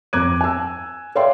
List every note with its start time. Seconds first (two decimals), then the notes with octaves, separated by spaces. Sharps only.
0.13 F2 A#5 D6 F#6 G#6 D#7
0.41 G#5 E6
1.15 C#5 D5 E5 F5 G5 C6